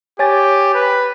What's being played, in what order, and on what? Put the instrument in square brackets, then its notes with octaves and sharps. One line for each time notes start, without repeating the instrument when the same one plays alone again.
[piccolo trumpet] G4 [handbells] C#5 G#5 A6
[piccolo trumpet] B4